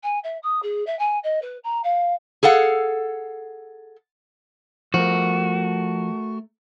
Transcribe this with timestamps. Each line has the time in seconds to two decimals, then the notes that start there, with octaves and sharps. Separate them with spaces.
0.03 G#5
0.24 E5
0.43 D#6
0.62 G#4
0.87 E5
0.99 G#5
1.24 D#5
1.42 B4
1.64 A#5
1.84 F5
2.43 G#4 A4 F5 F#5
4.94 F3 A3 F#4 A#4